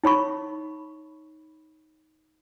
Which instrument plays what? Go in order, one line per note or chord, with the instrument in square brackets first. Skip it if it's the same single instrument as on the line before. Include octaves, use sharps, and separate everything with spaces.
[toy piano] D#4 C#5 B5 C#6